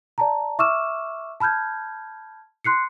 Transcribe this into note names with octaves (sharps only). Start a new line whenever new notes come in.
D5 A5 A#5
E5 C#6 D6 E6 F6 E7
A5 B5 F6 G6 G#6
C6 F#6 C7 C#7